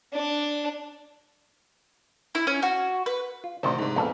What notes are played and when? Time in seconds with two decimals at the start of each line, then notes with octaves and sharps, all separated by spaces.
0.14 D4
2.35 E4
2.47 C#4
2.63 F#4
3.06 B4
3.44 F4
3.63 A1 D2 C3 D#3 C5
3.78 G#2 C3
3.96 A#1 F2 B3 A4 F5